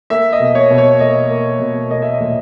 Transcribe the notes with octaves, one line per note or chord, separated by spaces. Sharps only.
A#3 E5
D#5
B2
C#5
B2
C#5
A#3 D#5
A#3
B2
A#3 D#5
E5
D#5
A#2